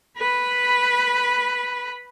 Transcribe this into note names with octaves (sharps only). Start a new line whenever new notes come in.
B4 B5